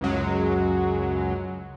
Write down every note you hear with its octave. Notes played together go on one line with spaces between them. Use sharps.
C#2 F#2 F#3 G#3